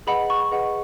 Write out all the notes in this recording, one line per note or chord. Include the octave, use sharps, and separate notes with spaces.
G#4 B4 D#5 F#5 B5
C#6
G#4 B4 D#5 F#5